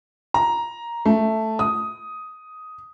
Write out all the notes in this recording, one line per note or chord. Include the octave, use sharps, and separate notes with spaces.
A#5
A3
D#6